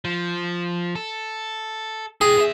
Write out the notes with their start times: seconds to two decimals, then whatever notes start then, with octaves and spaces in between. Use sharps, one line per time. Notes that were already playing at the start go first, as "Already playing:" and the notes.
0.05 F3
0.96 A4
2.21 E4 G#4 G5
2.37 B3 E5